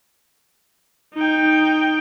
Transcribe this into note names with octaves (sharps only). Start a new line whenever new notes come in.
D#4 G5